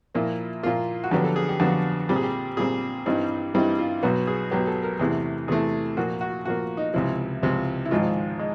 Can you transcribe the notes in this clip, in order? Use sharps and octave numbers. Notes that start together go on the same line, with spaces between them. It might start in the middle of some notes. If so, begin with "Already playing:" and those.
A#2 F3 A#3 E4
A#2 F3 A#3 F4
F#4
F2 D3 F#3 B3 D4 G4
A4
G#4
G4
F2 D3 F#3 B3 D4 F#4
A#2 G3 C4 G4
G#4
G4
A#2 G3 C4 G#4
G2 E3 G3 C4 D#4
G2 E3 G3 C4 D#4 E4
F4
B1 B2 F#3 B3 F#4
G#4
B1 B2 F#3 B3 G4
A4
A#4
E2 C3 E3 A3 G#4
E2 C3 E3 A3 G#4
A#2 F3 A#3 F#4
F#4
A#2 F3 A#3 F#4
D#4
C#2 C3 F3 E4
C#2 C3 F3
E4
G#1 G#2 F3 G#3 F4
G#3